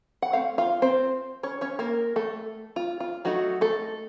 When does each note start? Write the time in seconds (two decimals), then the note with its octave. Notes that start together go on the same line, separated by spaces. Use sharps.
0.22 F#5
0.33 A3 C4 F5
0.58 F4 F5
0.82 C4 C5
1.43 C#4 C#5
1.61 C#4 C#5
1.79 A#3 A#4
2.16 A3 A4
2.76 F4
3.00 F4
3.25 F#3 A3 D#4 F#4
3.61 A3 A4